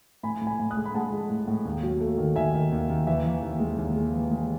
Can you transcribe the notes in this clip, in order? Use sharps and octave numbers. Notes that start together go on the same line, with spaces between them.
A2 G#5 B5
A2
G#5 B5
A2
D#6 F#6
G#3
B5
G#3 F#5 A5
G#3
A2
A2
D#2
F#3
A3
D#3
D#3 E5 G#5
D#3
D#2
D#2
E3 E5
E3
D#2
G#3
D#2
G#3
E3
G#3